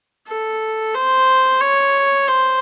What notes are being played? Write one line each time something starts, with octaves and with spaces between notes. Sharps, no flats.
A4
C5
C#5
C5